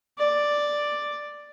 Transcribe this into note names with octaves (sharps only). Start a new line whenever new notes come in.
D5